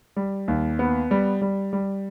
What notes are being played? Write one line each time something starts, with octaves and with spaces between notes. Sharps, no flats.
G3
D#2
B3
G3
G3
G3